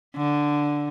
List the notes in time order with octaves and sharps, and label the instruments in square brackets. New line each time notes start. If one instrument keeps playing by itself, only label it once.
[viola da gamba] D3